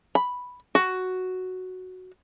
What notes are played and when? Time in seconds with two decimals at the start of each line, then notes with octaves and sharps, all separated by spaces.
0.15 B5
0.75 F#4